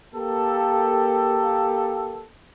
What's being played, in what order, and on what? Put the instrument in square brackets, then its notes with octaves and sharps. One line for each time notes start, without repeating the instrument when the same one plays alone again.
[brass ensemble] A#3 G4 A4